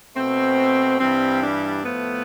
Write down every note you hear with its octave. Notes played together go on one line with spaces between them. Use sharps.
B2 A3 C4
G2 E3 G3 C4
D4
A2 F3 A3 B3